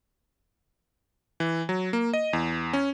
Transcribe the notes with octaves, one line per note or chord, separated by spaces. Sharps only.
E3
F#3
A#3
D#5
E2
C#4